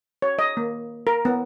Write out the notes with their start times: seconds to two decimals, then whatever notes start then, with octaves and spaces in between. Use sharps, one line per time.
0.22 C#5
0.39 D#5
0.57 A#3
1.07 A#4
1.25 B3